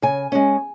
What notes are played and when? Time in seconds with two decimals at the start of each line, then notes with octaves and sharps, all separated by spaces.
0.02 C#3 G#5
0.32 G#3 C#4